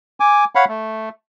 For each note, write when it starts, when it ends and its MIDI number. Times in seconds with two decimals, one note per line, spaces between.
0.20 0.45 80
0.20 0.45 86
0.55 0.65 73
0.55 0.65 77
0.55 0.65 78
0.55 0.65 83
0.68 1.09 57